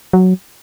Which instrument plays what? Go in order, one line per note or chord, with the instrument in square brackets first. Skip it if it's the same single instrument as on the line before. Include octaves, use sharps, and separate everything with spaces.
[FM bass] F#3